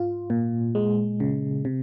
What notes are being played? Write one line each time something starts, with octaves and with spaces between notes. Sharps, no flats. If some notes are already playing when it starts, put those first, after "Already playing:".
Already playing: G#2 F4
A#2
G#3
C#3
C3